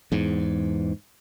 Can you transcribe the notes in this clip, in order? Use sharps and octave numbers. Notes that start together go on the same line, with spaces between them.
E2 G#2